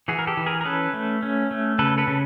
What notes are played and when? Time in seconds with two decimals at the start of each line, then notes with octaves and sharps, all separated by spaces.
0.08 E3 F#4 G#4
0.19 A#4
0.27 G4 A4
0.37 E3
0.46 G#4 A#4
0.61 A#4
0.65 C#4 A4 B4
0.94 A3
1.23 C#4
1.51 A3
1.79 C#3 A4 B4
1.98 A4 B4
2.07 C#3